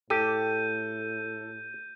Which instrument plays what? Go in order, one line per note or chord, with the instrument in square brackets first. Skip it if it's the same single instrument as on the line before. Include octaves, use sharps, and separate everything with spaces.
[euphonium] A2 [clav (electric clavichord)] G4 [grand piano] A4 [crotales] G6 D#7